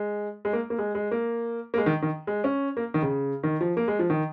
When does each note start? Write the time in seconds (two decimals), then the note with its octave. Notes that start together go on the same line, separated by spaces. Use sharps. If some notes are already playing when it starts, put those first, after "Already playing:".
Already playing: G#3
0.45 G#3
0.53 A#3
0.70 A#3
0.78 G#3
0.95 G#3
1.11 A#3
1.74 A#3
1.78 G#3
1.86 D#3
2.02 D#3
2.27 G#3
2.44 C#4
2.77 A#3
2.94 D#3
3.02 C#3
3.43 D#3
3.61 F3
3.77 A#3
3.88 G#3
3.99 F3
4.10 D#3